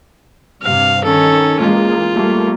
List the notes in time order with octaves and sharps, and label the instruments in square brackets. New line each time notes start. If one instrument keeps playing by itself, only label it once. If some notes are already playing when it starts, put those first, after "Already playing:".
[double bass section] G2 C3 [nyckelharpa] F5
[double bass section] D#3 [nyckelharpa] C#4 A4
[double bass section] E3 G#3 A#3 [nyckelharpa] F4
[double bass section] G3 A3 A#3